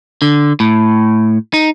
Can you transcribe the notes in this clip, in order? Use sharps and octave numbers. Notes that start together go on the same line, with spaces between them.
D3
A2
D#4